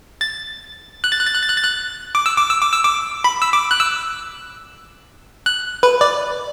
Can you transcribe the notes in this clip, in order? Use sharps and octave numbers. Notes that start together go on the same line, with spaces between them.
A6
F#6
A6
F#6
A6
F#6
A6
F#6
A6
F#6
D6
E6
D6
E6
D6
E6
D6
B5
E6
D6
F#6
E6
F#6
B4
D5